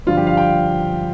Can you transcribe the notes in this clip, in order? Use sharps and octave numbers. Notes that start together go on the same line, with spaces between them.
G2 D3 F3 F4
G4
F5
G5